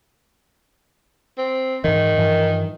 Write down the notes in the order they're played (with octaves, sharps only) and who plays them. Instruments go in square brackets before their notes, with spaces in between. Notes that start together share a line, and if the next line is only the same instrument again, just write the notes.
[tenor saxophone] C4
[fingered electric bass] G#2 E3 [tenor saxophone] D#3
[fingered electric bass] G2 E3 F3